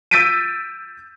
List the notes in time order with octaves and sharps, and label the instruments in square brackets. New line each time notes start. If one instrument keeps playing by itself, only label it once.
[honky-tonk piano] E6 G6 A6 B6 D7 D#7